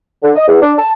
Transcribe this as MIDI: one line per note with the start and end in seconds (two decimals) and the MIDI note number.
0.23 0.31 50
0.36 0.46 75
0.48 0.58 40
0.62 0.73 62
0.78 0.92 81